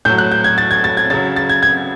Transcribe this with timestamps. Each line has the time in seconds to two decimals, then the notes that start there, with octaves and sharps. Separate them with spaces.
0.05 A2 F#3 G6
0.18 F#6
0.32 G6
0.44 G#6
0.58 A6
0.71 G#6
0.84 A6
0.97 G#6
1.10 C#3 F#3 A6
1.36 A6
1.49 G#6
1.63 G#6